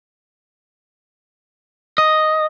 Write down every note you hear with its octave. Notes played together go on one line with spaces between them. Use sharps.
D#5